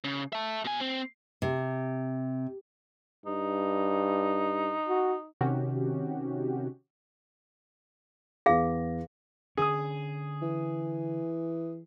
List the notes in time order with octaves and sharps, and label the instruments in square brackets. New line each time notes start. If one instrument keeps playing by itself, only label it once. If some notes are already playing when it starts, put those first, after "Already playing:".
[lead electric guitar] C#3
E5 A5
B2 G#5
C4
[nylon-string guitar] C3
[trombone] G2 [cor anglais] D#4
[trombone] F#4
[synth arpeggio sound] C3 D#3 C#4 F#4 G4
[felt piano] E2 A#6 [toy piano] G#4 F5
[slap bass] D3 C#4 [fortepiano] G#4 D#6
[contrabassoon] E3